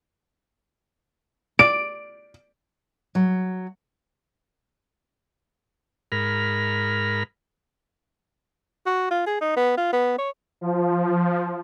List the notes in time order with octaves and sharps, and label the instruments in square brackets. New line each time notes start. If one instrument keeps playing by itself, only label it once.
[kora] D5 [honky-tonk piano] D7
[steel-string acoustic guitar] F#3
[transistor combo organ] G#2 A#4 B5 F6
[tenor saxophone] F#4
F4
G#4
D#4
B3
F4
B3
C#5
[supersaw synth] F3